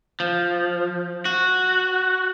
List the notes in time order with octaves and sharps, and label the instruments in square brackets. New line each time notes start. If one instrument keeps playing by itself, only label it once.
[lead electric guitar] F3
F#4